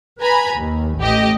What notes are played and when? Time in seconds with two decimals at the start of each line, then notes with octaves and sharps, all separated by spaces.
0.20 B4 G#5 A#5 B5
0.57 D#2
0.99 A1 G4 D#5